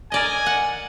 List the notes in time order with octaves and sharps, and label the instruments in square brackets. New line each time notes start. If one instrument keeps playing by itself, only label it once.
[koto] A#4 D5 D#5 [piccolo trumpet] G#5
[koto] F#5